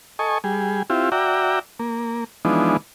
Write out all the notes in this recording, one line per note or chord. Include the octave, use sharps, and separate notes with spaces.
A4 D#5 G#5 C#6
G3 G#4
C4 E4 F4 G4
F#4 D5 E5 G5 A#5
A#3
E3 F3 G#3 B3 D4 D#4